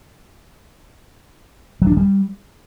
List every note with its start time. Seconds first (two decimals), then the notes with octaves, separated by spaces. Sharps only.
1.82 F#3
1.87 D4
1.92 F3
1.97 G3